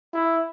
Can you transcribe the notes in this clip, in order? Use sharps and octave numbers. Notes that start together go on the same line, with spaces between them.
E4